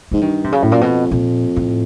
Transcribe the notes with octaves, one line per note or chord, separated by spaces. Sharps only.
G#2 E3
G2 D#3
C3
F#2 C#3
A2
A#2
F2 B2
F2 A#2
A2